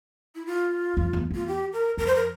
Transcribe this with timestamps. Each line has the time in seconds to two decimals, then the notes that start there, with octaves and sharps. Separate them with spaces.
0.35 E4
0.46 F4
0.97 F2
1.13 E2
1.31 E2 F4
1.48 G4
1.73 A#4
1.97 F2 A#4
2.06 C5
2.15 A#4